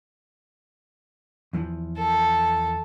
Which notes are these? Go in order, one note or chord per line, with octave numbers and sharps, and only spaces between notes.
E2 E3 F3
A4